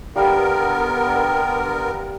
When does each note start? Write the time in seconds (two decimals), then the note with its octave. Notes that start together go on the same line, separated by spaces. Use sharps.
0.16 D3 G3 B3 A#4 F5